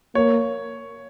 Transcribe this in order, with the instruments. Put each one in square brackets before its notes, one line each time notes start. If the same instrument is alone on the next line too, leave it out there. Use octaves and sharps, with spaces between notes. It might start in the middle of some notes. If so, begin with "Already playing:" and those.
[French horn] A#3 [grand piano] C#5